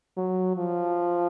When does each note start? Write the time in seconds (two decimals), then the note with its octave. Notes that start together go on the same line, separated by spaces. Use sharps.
0.17 F#3
0.57 F3